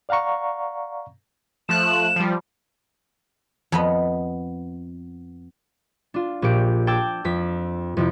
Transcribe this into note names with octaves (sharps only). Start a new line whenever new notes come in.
D5 F5 F#5 A#5 C#6
F3 A3 F#6 E7
F3 G3
F2 B3 D#5
D4 F4
A#1 A#2 G4 D7
G5 A5 D6 E6 G6 G#6
F2 B6
F2 C3 E4